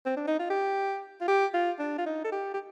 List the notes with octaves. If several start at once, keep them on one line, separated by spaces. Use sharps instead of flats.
C4
D4
D#4
F4
G4
F4
G4
F4
D4
F4
D#4
A4
G4
G4